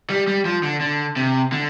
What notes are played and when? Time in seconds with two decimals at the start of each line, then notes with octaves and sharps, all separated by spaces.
0.10 G3
0.27 G3
0.45 F3
0.63 D3
0.81 D3
1.16 C3
1.52 D3